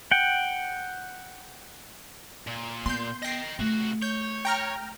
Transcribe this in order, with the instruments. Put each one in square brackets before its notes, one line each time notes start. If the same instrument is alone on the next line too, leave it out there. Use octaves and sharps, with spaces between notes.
[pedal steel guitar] F#5 G5
[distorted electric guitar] A#2
[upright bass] B3 [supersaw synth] C6 G6
[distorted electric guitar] D#5 G5 [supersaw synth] A#6 C7
[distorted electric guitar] C3 F#4 [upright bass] A3
[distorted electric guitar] C#5 [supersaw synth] G6
[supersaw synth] G5 A#5 F6